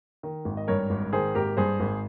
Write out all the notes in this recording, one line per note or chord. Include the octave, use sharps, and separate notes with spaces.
D#3
G#1
D#5
G2 A#4 C#5
G#1
D#3 G#4 C5
G#1 G4 A#4
G2 G#4 C5
G#1